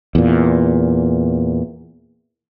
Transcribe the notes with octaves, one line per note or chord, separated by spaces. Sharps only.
E2 A#2